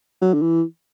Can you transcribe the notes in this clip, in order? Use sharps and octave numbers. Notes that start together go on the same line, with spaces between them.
F#3
D3
E3